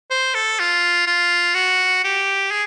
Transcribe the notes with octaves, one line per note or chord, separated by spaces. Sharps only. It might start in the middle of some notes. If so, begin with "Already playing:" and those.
C5
A4
F4
F4
F#4
G4
G#4